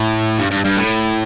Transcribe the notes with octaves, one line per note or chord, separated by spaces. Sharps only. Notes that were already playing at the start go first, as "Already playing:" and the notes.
Already playing: A2
G2
G2
G2
A2